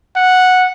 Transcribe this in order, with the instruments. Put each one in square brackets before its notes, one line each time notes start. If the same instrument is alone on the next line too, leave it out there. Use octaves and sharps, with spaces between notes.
[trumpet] F#5